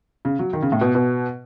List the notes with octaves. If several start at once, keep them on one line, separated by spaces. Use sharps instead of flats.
C#3
F#3
D#3
C#3
A2
B2
B2